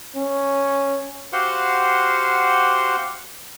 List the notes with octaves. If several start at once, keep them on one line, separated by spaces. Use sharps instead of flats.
C#4
F#4 G4 C5 F5 F#5 C6